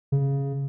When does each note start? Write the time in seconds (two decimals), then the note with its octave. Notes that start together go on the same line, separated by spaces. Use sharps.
0.12 C#3